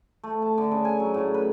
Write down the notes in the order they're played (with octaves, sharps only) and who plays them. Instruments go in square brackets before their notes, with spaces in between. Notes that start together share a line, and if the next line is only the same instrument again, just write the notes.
[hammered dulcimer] A3
A5
D3
C#3
G#5
F#3
A2
B4